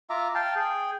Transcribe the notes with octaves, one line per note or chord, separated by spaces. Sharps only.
F4 E5 A#5 D6
F5 G5 A5
G#4 G5